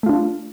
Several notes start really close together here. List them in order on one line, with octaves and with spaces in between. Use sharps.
A3 F4 D4